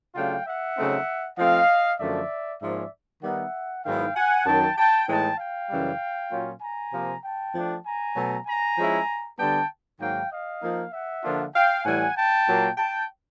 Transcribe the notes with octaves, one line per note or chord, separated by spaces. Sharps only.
C#3 F#3 A3 D4 F4 F5 G5
E5 F#5
C#3 F#3 A3 C4 D#4
F3 A3 C4 D#5 F5
F#2 D3 F3 A3 D5 E5
G#2 F3 A#3 C#4 D5 E5
D#3 G3 B3 D#4 E5 F#5
G#2 D#3 F#3 B3 E4 F5 G5
F#5 G#5
F#2 D#3 F#3 G5 A5
G5 A5
A2 E3 G#3 B3 D#4 G5 A5
F5 G5
F#2 C#3 E3 G3
A#2 F#3 A#3 C#4 F4
G#5 A#5
C3 F3 A#3
G5 A5
F3 A3 D4
G#5 A#5
B2 F#3 A3
G#5 A#5
F3 G#3 C#4 E4
D3 G3 B3 G5 A5
G#2 D#3 F#3 A#3 F5 G5
D#5 F5
F3 A#3 D#4
E5 F#5
D3 F3 A#3 D4 F4
F5 G5
A2 E3 G3 F#5 G#5
G5 A5
A#2 F#3 A#3
G5 A5